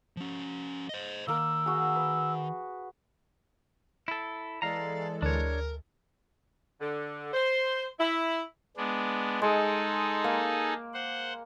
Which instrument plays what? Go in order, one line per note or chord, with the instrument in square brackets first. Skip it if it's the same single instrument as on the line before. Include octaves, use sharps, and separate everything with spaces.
[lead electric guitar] F3 C#4
C5 D#5
[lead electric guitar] D#3 [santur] A#3 A#4 [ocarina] E6
[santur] F#4 G#4
B4
[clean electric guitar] E4 A4
[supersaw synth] E3 G#3 A4 [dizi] D5 [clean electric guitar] F5 A#5
[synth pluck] D2 [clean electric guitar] D4 C#5 [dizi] A#4
[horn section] D3
C5
E4
[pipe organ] G#3 B3 D4
[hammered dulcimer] G#3 [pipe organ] D#4 G#4 A4
[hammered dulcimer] A#3
[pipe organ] C5 F#5